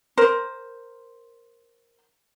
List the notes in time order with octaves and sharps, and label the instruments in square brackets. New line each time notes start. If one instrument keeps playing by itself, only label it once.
[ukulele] A#4 C5